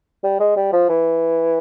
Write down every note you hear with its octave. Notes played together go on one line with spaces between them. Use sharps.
G3
G#3
G3
F3
E3